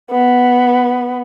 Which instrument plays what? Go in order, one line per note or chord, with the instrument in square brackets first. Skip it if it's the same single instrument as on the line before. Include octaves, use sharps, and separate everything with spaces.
[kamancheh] B3